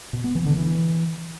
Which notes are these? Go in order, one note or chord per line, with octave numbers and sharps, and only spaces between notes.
B2
B3
E3
D3
E3